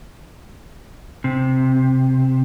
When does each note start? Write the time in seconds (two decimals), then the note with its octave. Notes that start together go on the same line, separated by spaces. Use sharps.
1.24 C3